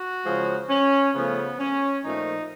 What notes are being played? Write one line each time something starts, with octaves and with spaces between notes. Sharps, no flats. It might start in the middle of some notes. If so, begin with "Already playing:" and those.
Already playing: F#4
C#3 F3 G#3
C#4
C#3 F3 A3 B3
C#4
A#2 F3 A3 D#4